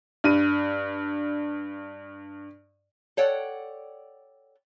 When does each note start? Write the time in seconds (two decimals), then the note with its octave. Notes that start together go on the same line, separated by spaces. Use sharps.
0.24 G2 D#7
3.17 A4 C#5 D5 F#5 G5